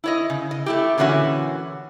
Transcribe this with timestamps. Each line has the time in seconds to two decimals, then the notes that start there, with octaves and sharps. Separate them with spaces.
0.04 E4 C#5 D#5
0.30 C#3
0.51 D#5
0.66 A3 E4 G4
0.98 A#2 D3 E3 C#4 F#4 E5